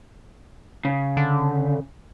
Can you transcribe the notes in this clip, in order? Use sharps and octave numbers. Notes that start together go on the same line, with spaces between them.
C#3
D3